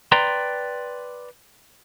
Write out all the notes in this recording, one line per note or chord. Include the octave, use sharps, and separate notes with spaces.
B4 D5 G5 A#5 C6